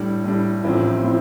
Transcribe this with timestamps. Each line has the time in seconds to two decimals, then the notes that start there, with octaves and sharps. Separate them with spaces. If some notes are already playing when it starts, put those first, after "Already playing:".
Already playing: A2 G3 D4
0.24 A2 G3 D4
0.64 A1 A2 F3 C4 E4
1.04 A2 F3 C4 E4